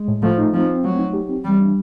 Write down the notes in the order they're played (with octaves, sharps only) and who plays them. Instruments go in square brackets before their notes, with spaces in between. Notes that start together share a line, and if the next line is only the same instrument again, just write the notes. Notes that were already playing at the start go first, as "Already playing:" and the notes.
Already playing: [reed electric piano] G#3
A2
[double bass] F3 [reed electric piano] A3
[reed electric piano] D#4
[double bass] F3 [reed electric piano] C4
[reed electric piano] C4
[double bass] F#3 [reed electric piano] A3
[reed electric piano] D#4
G4
C4
[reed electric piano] E3 [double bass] G3
[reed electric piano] D4